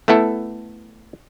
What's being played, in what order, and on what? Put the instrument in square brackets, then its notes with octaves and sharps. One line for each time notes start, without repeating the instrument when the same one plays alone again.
[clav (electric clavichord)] A3 B3 E4 A4